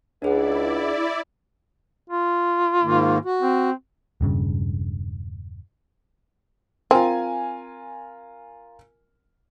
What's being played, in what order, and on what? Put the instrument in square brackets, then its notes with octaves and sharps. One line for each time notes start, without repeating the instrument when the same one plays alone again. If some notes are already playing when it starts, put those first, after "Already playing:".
[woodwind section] C#2 [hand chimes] D4 G#4 F#5 [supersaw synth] E4 D5
[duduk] F4
[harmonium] G#2 D#3 A#3
F#4
[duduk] C4
[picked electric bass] E1 G2 C#3
[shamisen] C4 [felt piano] F4 A#4 G#5